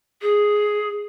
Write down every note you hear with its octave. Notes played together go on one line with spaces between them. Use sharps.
G#4